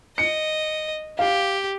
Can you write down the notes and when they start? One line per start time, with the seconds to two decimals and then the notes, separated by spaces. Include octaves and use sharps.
0.18 D#5 C#7
1.19 G4 F5